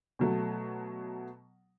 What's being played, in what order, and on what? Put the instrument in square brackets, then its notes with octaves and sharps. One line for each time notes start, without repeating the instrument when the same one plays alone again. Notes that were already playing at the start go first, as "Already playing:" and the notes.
[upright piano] B2 F#3 A3